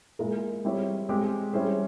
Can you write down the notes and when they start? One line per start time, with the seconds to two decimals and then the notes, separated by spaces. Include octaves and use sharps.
0.19 A#2 G#3 E4 A#4
0.65 G3 C4 E4 G4 C#5
1.09 G#3 C4 G4
1.53 G3 C#4 E4 G#4 C5